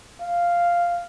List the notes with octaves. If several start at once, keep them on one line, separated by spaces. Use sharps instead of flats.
F5